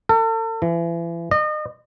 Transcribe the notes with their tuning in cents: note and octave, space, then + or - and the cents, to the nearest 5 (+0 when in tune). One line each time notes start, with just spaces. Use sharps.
A4 +40
E3 +35
D#5 -35